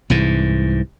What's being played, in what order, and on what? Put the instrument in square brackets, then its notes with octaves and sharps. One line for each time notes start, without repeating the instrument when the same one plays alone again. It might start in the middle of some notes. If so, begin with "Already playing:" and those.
[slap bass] C2 G#2 E3